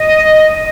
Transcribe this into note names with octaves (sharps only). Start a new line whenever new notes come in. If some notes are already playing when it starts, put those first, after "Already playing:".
Already playing: D#5